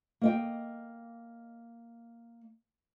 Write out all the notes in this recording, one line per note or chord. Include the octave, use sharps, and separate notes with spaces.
A#3 D#5 G5